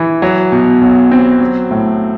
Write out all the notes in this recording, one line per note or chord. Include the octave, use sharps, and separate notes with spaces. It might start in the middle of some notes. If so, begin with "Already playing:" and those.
Already playing: E3
F#3
B2
B1
C4
F#3
A2